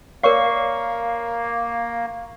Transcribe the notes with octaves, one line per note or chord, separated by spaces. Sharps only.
A#3 A#4 C#5 D5 F5 C#6